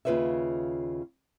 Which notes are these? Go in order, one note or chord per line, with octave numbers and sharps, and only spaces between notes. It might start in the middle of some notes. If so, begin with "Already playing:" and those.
D#2 C#3 F4 B4 C#5 E5